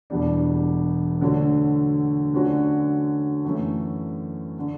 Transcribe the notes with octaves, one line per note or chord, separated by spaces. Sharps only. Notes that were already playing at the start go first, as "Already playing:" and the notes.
E1 E2 B2 G3 D4
D2 D3 F#3
D2 D3 F#3 C#4 F#4
F#2 E3 A3
D3